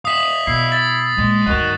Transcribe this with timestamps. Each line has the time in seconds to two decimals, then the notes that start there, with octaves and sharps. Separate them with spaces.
0.05 E5 F5 D#6 B6 F#7
0.47 B2 E4 C7
0.72 A6
1.18 A#2 G#3
1.47 D2 G2 F#4 A#4 D#5